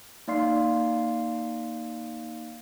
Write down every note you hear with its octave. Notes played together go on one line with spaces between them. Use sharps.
A#3 D#4 D5 F5 C6 C7